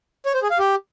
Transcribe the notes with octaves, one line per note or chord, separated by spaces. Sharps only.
C#5
C5
G#4
F5
G4